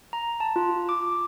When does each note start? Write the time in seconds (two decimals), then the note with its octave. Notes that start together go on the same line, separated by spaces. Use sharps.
0.13 A#5
0.40 A5
0.56 F4
0.89 D6